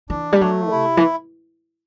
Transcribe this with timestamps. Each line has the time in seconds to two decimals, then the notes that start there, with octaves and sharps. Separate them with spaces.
0.10 E3 D4
0.32 G3
0.41 F#3 A3
0.71 C3 E4
0.97 E3